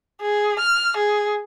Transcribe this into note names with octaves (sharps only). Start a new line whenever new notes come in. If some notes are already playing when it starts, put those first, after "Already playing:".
G#4
F6
G#4